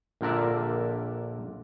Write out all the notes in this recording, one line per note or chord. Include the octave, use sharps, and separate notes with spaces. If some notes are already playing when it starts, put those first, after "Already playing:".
A#1 A#2 D3 A#4 D5 E5